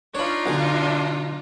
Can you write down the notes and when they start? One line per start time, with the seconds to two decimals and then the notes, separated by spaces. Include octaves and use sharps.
0.15 D4 D#4 F4 C#5 B5
0.46 B1 D3 G#5